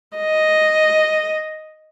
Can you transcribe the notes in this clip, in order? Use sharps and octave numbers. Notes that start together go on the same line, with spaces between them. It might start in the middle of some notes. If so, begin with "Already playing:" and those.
D#5